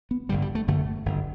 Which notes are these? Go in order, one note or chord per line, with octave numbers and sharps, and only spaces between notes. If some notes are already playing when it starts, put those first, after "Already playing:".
B3
G1 G2 D3 G3
G3
A3
G1 F#2 D3 A3
G1 F#2 D3